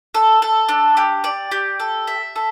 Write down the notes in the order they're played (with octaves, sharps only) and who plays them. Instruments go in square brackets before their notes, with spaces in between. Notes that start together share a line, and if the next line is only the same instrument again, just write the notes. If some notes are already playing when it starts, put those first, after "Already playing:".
[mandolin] A4
A4
D4
G4
D5
G4
A4
E5
A4